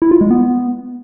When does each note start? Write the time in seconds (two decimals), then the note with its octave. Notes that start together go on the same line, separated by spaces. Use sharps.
0.02 E4
0.11 F4
0.21 G#3
0.30 B3